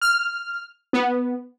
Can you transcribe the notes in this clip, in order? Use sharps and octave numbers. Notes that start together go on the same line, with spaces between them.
F6
B3